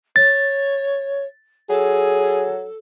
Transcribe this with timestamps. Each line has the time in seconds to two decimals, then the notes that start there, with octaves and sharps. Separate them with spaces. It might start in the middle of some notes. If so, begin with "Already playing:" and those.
0.16 C#5 A6
1.70 F#3 G#4 A4